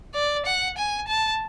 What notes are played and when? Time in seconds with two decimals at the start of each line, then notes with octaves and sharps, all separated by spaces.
0.14 D5
0.46 F#5
0.78 G#5
1.08 A5